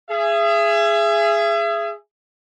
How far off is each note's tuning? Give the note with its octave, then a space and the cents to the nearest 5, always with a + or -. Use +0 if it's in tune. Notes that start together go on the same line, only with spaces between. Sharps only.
G#4 +0 E5 +35